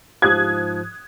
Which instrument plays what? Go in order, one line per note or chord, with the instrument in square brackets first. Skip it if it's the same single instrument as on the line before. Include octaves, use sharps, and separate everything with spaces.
[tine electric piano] G#2 F3 [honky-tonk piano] D#6 F#6 G#6